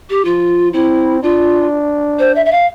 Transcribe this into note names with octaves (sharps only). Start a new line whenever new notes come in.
G4
F3 F4
C4 E4
D4 F4
C5
E5
E5
F5